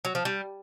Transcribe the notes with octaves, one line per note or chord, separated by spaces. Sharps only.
F#3
F3
G3